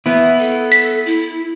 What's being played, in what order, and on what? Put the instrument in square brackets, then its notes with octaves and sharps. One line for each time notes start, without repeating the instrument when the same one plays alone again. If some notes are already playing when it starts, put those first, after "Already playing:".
[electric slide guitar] B3 E4
[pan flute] A4
[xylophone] B6
[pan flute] E4